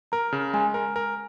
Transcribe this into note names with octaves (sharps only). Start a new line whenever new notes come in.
A#4 A#5
C#3
G#3 G#5
A#4
A#4